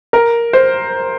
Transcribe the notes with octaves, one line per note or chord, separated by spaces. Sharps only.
A#4
C5